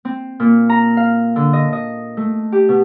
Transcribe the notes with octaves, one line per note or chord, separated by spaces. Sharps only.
C4
A#2
A#5
F5
D3
D#5
D#5
A3
G4
B2